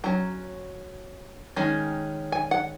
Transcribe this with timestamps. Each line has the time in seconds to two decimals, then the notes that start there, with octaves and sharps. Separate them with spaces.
0.04 F#3 C#4 A#5
1.56 D#3 G#3 C#4
2.32 G#5
2.51 F#5